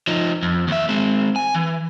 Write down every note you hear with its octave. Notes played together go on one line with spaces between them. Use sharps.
F3 D#4
F2
D#2 E5
G#3 C4
G#5
E3